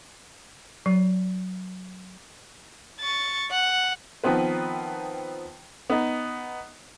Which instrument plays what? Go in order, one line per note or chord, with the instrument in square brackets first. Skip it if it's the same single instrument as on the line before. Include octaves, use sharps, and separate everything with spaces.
[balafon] F#3
[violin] C#6 A6
F#5
[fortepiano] D#3 F3 B3 C4 B4
B3 D#4